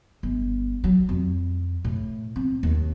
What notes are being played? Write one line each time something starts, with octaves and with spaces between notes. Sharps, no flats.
G1
F#3
F2
A2
C4
D#2